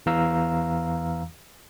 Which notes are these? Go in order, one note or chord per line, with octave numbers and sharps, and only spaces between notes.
E2 E3 F5 A#5 E6